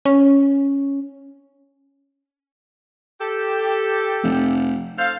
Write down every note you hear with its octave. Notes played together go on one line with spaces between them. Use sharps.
C#4
G4 A4
F1
A4 C5 F5